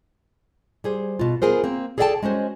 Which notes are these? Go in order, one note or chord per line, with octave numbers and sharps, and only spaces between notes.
G3 G#4 C5
B2 F4
B3 F4 G#4 A#4 C5
A#3 C4
G#4 A4 D5 E5 G5 A5
G#3 C#4 F#4 C5